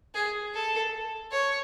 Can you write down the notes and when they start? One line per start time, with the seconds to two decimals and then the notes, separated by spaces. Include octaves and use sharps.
0.15 G#4
0.54 A4
1.31 C#5